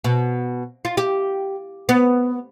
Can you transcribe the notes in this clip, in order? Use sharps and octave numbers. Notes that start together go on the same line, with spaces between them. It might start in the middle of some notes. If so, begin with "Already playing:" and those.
B2
F4
G4
B3